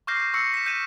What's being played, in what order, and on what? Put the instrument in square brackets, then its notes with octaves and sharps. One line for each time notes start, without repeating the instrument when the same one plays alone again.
[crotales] C#6 D6 F6 G6 A#6 C7
C#6 E6 A#6 C7 C#7
B6 E7
G6 B6 C7 D#7 E7